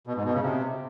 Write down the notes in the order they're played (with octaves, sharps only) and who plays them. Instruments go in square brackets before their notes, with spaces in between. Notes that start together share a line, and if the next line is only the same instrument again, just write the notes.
[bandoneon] B2
G#2
B2
C#3
C3